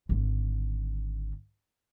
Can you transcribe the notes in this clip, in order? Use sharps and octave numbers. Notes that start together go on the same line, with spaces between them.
G#1 D3